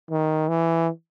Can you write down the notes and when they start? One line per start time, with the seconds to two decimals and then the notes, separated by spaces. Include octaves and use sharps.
0.11 D#3
0.49 E3